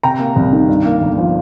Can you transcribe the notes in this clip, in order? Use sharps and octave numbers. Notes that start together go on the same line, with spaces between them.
C3 G5 A#5
A#3
C2
D#3
G2
A#3
G1
F3